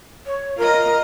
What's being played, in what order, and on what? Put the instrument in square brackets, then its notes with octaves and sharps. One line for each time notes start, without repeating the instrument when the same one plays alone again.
[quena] C#5
[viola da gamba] F4 D#5 [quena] A#4